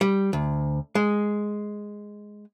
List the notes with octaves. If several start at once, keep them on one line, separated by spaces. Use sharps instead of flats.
G3
D2
G#3